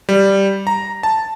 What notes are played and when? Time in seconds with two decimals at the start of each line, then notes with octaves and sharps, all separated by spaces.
0.09 G3
0.67 A#5
1.03 A5